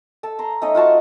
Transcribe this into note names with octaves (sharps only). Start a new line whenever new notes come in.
A4 A5
A#5 C6
A3 C#4 D#4 D#5
F4 F#4 A5 C#6